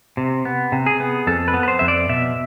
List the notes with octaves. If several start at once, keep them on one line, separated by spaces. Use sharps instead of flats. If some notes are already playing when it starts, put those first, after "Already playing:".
C3
B3
C3
G#4
B3
F2 A4
B4
B3
B4
C5
F2 E5
D5
B2 E5